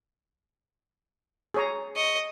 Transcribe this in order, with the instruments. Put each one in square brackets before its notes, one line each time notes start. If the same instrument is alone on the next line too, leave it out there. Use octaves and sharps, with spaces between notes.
[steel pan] G#4 C#5 A#5
[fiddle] D#5 [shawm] C#6